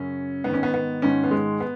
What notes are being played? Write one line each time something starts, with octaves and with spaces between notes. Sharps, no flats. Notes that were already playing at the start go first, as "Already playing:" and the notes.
Already playing: F#2 C#3 C#4
G#2 D#3 B3
C#4
B3
B3
G#2 D#3 C#4
B3
G#3
B3